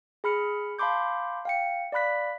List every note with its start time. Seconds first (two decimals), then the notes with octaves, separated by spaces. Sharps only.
0.24 G#4 B5 F6 C#7
0.79 F5 A5 B5 C6 D6 G6
1.45 F5 G5 C#7
1.92 D5 F5 B5 F#6 B6